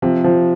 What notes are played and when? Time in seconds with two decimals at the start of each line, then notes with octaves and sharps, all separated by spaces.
0.02 C3 F3
0.24 F3